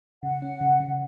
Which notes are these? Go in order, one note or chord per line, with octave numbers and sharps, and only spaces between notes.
C#3 F#5
C#4
C#3
C#3